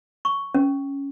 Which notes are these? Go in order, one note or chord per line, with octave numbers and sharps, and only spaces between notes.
C#6
C#4